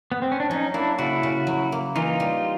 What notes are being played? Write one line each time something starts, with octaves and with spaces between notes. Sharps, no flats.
B3
C4
C#4
D4
F#3 C#4 D#4
A#3 D4 E4
C#3 E4 F#4
C#3
F#3
A#3
E3 D#4 F4
G3